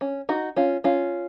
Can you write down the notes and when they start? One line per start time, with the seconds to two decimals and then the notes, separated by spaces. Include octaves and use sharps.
0.01 C#4
0.29 D#4 F#4
0.56 C#4 F4
0.84 C#4 F4